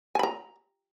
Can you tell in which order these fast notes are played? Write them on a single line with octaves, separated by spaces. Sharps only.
G#5 B5 A#5